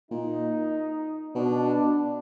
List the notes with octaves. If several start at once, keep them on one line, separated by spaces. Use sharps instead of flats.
A#2 D#4
B2 D4